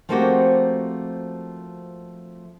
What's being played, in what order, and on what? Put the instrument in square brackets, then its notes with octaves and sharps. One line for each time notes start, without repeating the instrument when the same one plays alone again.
[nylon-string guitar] F3 A3 A#3 C4 F#4 G4